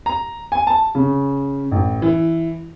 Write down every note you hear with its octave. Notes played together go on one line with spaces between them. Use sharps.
A#5
G#5
A5
C#3
A1
E3